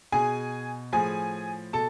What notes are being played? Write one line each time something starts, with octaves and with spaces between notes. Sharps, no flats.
B2 G#4 G#5
A2 F3 G#4 G#5
B2 A4 A5